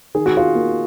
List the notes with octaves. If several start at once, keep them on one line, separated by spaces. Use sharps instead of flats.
D#3 G#4
F#4
F4 G#4
A#3